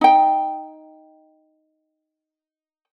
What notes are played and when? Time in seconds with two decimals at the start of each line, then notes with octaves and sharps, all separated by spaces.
0.01 D#4 G5